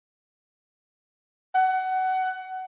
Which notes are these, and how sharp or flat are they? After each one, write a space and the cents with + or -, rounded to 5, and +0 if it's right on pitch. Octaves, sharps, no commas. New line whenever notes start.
F#5 +20